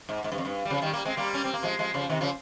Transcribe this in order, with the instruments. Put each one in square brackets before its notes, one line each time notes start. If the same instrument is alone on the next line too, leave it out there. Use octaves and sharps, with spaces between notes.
[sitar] G#2
G#2
G2
F2
G2
G3
C#3 F3
D#3 G3
G3 A#3
G#3 C4
G3 A#3
C#4
C4
A#3
F3 G#3
F3 G#3
C#3 F3
C3 D#3
C#3 F3